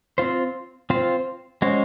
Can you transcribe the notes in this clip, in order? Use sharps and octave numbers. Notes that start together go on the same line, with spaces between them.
C4 F4 C5
C4 F4 C5
G#3 C#4 F#4 C5